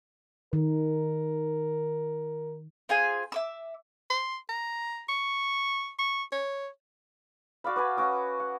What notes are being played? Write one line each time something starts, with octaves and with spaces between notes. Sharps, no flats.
D#3 A#4
C4 F4 G#4 G#5
E5 D6 E6
C6
A#5
C#6
C#6
C#5
F#4 D5 F5 B5
B4 D5 G#5 B5
C#4 F#4 D6 D#6
F#5